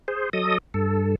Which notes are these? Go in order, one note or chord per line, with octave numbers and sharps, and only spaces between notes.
G#4 C5
F#3 A4 D#5 D#6
G2 A4